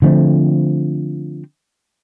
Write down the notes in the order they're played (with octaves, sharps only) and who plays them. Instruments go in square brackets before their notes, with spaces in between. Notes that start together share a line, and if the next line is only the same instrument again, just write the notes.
[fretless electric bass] D3 F3 A3 C4